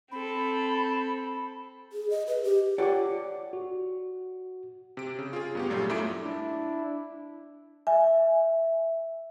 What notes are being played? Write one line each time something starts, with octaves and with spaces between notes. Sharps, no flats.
C4 A4 B5
G#4
D#5
B4
G4
F4 G4 C#5 D5 F#5 D6
F#4
C3 D7
C#3
F4 G#4
G2 B3 G4
A#2 F#3 G3 A3 F4
F#2 A3 E4 E5 D6 D7
D4 E4
E5 G#5